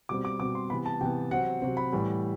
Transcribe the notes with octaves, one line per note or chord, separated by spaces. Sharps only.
B2 G3 C4 D6
D6
B2 G3 C4 D6
C6
C3 E3 B3 B5
A5
C3 E3 B3 G5
C3 F#3 C4 F#5
C3 F#3 C4
B5
A2 E3 G3